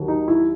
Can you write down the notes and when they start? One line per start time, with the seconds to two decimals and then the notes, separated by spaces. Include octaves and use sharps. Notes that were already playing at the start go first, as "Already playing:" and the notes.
Already playing: D#2 D#3 F#3
0.08 D#4
0.28 E4